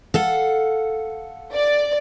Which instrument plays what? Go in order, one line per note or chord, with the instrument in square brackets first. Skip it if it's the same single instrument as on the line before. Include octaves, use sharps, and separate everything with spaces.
[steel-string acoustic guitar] A4 F5 F#5
[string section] D5